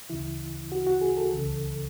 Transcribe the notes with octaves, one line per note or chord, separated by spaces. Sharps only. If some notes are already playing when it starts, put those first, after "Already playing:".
D2 C#3 E3 E4
F#4
F#4
G#4
A4
C#2 C#3 E3